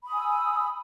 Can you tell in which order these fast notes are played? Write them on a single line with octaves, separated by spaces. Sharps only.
B5 D#6 G#5 E6